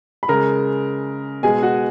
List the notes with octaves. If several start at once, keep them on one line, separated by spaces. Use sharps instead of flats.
B5
C#3 G#3 A#4 A#5
B2 G#3 G#4 G#5
F#4 F#5